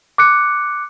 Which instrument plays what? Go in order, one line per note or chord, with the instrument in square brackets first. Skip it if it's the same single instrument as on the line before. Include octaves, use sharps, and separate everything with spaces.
[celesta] D6 F#6 C#7